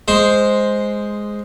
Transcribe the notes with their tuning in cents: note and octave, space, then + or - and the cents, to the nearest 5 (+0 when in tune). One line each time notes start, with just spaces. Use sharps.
G#3 +0 C5 +0